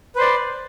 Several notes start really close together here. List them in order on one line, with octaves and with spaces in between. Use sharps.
B4 C5 D5